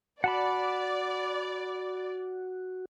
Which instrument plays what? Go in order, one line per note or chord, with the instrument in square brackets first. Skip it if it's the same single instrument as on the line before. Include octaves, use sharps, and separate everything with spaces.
[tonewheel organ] F#4 [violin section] D5 [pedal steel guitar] F#5 A5 B5